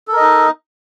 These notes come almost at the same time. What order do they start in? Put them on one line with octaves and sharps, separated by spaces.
A4 A#4 D#5 D#4